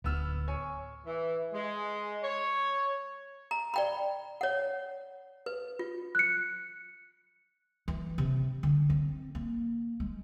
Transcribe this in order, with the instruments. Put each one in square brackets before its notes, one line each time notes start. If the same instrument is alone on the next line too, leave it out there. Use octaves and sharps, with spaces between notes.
[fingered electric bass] D1 [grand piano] B3 E6 F6
[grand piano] C#5 G#5
[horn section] E3
G#3
C#5
[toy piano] A#5
D5 G5 B5
C#5 F#5
B4
F4
[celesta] F#6 C#7
[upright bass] E3
C3
D3
C4
A#3
G#3